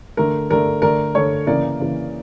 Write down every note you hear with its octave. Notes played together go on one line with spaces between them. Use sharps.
D3 A3 A#4
D3 A3 A#4 D5
D3 A3 A#4 D5
D3 A3 A4 C#5
C#3 E3 A#3 A#4 D5
C#3 E3 A#3